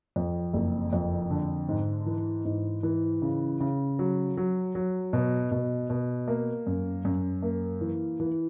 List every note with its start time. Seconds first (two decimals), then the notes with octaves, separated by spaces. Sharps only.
0.16 F2
0.54 F#1
0.93 F2
1.30 D3
1.69 G#2
2.06 E3
2.45 G#2
2.83 E3
3.22 C#3
3.60 C#3
3.99 F#3
4.37 F#3
4.75 F#3
5.13 B2
5.51 B2
5.90 B2
6.28 A#3
6.67 F#2
7.05 F#2
7.43 A#3
7.81 E3
8.20 E3